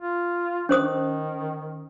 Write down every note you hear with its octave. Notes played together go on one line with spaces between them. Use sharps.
F4
D#3 C#4 C5 D#6